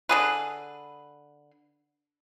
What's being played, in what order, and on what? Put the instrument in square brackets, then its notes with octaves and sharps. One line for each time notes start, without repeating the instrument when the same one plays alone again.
[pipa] D3 G#4 B4